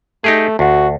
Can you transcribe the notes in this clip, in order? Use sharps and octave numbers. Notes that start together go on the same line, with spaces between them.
A3 D#4 G4 G#4
D2 F#4